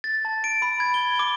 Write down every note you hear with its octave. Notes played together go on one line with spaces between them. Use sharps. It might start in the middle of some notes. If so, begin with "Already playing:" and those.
A6
A5
D7
B5
G#6
G7
D6